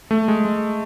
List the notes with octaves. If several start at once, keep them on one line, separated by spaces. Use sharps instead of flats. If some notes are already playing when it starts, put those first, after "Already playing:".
A3
G#3
G#3